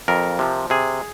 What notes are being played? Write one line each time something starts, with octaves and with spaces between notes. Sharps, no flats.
F2 A#4
C3 F3
C3 G#4